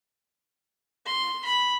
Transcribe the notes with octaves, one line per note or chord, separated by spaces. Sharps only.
C6
B5